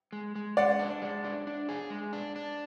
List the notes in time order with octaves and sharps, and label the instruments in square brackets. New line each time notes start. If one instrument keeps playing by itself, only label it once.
[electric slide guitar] G#3
G#3
[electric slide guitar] G#3 [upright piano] D5 F#5
[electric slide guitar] D4
G#3
D4
D4
G#4
G#3
D4
D4